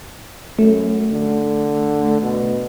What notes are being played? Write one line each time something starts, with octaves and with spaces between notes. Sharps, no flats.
F#2 A3
D3
B2